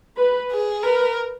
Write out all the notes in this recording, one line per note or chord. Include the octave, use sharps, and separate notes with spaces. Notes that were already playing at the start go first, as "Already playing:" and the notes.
B4
G#4
A#4 B4